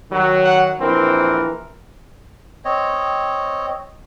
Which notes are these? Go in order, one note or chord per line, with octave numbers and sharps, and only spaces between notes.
D#3 F#3
F#5
A#1 E3 C4 A#4
C4 C#5 D#5